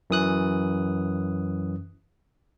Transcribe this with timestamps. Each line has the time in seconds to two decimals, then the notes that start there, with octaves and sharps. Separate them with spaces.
0.10 F#2 E3 D#6 F#6